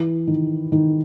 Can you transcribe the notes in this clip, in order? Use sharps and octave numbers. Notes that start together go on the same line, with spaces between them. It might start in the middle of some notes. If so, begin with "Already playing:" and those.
Already playing: E3
D#3
D#3